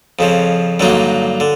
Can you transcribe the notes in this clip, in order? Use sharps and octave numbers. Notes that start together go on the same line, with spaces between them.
F2 C#3 F3
G2 D3 F#3 A#3 D#4
D3